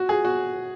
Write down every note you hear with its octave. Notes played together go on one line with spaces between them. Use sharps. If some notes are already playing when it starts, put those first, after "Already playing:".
Already playing: F#4
G#4
F#4